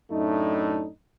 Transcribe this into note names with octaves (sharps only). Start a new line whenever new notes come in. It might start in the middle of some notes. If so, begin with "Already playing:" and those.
F#2 A2 A3 D4 D#4